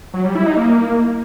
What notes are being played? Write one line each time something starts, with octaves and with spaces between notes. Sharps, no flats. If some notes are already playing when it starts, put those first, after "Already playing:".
F#3
G3
E4
D#4
A#3